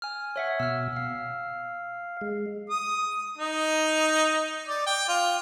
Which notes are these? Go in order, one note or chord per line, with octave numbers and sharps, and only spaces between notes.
G#5 F6
C#5 E5 F#5
B2 E6 F6
F5
G#3
D#6
D#4
D5
G5
F4